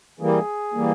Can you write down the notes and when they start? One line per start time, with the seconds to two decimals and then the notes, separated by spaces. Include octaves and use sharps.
0.20 E3 G3 A#3 G#4
0.74 E3 G3 A#3